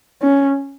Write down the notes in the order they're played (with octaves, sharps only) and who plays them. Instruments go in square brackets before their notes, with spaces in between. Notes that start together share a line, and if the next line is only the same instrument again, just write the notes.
[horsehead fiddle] C#4